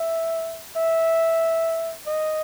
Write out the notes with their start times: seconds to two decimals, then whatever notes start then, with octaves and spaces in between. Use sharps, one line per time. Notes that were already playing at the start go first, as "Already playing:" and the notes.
Already playing: E5
0.77 E5
2.07 D#5